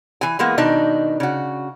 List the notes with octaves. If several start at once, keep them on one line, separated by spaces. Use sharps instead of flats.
E3 G#5
E3 G#3 A#3 B3
B2 D#3 D4 D#4
C#3 F#4